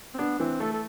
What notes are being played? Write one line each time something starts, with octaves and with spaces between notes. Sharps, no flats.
C4
B3 D4
E3 C4
A3 A4
A4